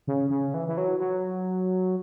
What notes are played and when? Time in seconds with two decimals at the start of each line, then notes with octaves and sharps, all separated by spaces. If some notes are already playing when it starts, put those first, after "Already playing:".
0.07 C#3
0.30 C#3
0.54 E3
0.68 E3
0.77 F#3
1.00 F#3